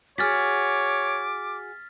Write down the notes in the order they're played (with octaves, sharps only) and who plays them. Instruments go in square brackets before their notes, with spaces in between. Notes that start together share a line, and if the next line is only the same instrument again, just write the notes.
[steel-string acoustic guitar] F#4 G#4 [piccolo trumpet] C#5 [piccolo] D6 [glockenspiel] F6 A6 B6